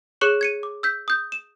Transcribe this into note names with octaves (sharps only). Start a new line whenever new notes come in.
G#4 C#5 C#6 F#6 C#7 F#7
G#6 C#7 D#7
D6
E6 G6 B6
D#6 G6
E7